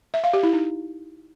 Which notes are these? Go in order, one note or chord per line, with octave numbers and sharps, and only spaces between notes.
E5
F5
G4
E4
D#4